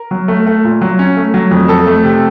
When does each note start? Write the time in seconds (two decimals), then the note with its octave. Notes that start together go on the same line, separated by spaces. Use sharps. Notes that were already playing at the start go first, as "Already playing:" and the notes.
Already playing: A#4
0.11 F#3
0.28 A3
0.46 A3
0.64 A#2
0.81 F#3
0.99 C#4
1.17 A3
1.34 F#3
1.51 F2
1.68 F2 A4
1.86 A3
2.04 C3